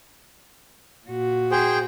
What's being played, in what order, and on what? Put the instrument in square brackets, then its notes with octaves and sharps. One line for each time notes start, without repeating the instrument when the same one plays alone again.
[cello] A#2 F#4
[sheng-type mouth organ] G#4 C5 G5